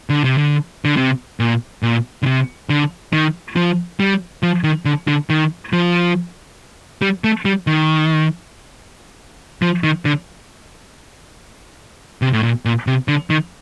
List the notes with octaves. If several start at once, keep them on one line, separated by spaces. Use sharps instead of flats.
D3
C3
D3
D3
C3
A#2
A#2
D3
C3
D3
D#3
F3
G3
F3
D#3
D3
D3
D#3
F3
G3
A3
G3
D#3
F3
D#3
D3
C3
A2
A#2
A#2
C3
D3
D#3